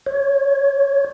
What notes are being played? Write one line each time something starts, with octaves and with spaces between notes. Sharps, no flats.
C#5